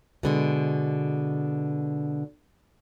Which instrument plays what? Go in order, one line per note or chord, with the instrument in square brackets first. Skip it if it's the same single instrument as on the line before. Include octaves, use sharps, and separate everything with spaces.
[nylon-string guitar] B2 D3 G#3